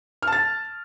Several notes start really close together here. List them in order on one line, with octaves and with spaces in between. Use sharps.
F6 A5 A6